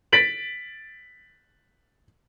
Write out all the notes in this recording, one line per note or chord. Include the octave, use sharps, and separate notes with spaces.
A6 B6 D7 F#7